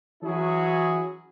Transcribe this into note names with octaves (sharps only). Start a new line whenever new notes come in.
E3 F#3 C#4 E4 F#4 G#4